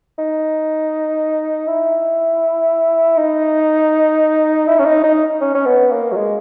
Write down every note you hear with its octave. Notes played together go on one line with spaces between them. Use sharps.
D#4
E4
D#4
E4
C#4
D#4
D#4
C#4
C#4
B3
A#3
F#3
G#3